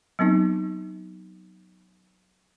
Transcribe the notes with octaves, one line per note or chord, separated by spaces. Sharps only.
F#3 B3 C4 D#4